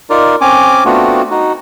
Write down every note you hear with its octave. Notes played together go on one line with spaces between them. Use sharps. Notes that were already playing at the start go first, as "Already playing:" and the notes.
D#4 F4 A#4 D5
C4 C#4 G#5 D6
A3 B3 C4 D4 F4 F#4
D#4 F#4